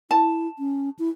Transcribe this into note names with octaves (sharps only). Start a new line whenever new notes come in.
E4 A5
C#4
E4